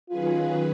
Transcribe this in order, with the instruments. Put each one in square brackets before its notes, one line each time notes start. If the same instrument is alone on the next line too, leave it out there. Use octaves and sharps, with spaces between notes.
[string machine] D#3 F#3 C#4 G#4 B4 [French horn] F4